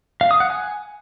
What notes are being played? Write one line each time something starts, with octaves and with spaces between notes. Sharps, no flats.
F5
D#6
F#5
G#5